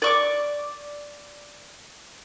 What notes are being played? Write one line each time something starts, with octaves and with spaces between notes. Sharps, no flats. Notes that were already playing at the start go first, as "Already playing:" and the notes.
D5 C#6 D6